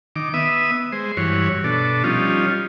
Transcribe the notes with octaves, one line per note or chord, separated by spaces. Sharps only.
D#3 D6
B3 E5 D#6
G#3 C5
G2 E3 F#4 C#5
B2 D4 A4
F3 G3 C#4 D#4 F4